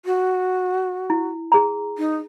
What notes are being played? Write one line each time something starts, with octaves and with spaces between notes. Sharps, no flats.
F#4
E4
G#4 A#5
D#4